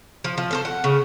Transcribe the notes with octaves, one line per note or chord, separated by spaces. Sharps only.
F3
F3
A4 A#4 C5
F#5
C#3